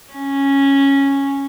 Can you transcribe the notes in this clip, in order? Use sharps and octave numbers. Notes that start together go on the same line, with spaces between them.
C#4